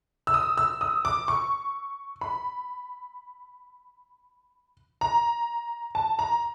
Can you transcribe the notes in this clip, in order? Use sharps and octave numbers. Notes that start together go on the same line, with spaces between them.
E6
D#6
E6
D#6
D6
C#6
B5
A#5
A5
A#5